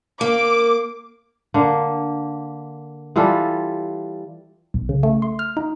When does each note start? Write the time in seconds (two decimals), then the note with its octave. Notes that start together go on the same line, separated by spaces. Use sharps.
0.21 A#3 D6
1.54 D3 A#3
3.16 E3 G3 F4 A4
4.74 B1
4.89 C#3
5.03 A3
5.22 C6
5.39 F6
5.57 D#4